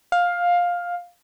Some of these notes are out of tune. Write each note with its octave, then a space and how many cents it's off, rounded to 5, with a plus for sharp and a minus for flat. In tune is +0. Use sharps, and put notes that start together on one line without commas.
F5 +10